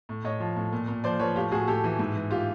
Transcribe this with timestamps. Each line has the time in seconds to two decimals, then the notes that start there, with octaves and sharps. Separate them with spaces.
0.09 A2
0.24 A2 C#5 D#5
0.40 F3
0.56 A2
0.72 A#2
0.88 A#2
1.04 F3 C5 D5
1.19 F3 B4 C#5
1.36 A2 F4 G4
1.51 A2 F#4 G#4
1.67 A2 G4 A4
1.84 E3
1.99 G#2
2.16 E3
2.31 F4 G4